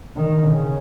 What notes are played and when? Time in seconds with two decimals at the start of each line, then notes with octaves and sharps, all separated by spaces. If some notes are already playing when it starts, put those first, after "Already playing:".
0.16 D#3
0.47 C#3